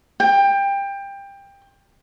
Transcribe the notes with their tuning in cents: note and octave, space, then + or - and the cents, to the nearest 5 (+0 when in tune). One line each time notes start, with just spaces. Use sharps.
G5 +20